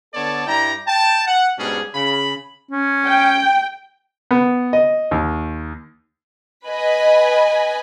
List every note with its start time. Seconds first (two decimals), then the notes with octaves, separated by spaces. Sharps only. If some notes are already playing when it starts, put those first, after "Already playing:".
0.14 D3 B3 A4 C#5 D5 A5
0.47 G2 E4 D5 G5 A#5
0.87 G5 A5
1.26 F#5
1.58 G#2 B2 G3 C#4 D4 G#4
1.94 C#3 B5
2.71 C#4
3.05 G5
4.31 B3
4.73 D#5
5.11 D#2
6.67 B4 D#5 G#5 B5